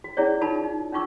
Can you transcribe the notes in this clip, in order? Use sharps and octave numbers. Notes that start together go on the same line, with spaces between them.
F#4
C#4 E4 G#4 C#5 D5
D#4 F4 A#4 A5 B5
D#4
C#4 D#4 F4 C#6 D6 E6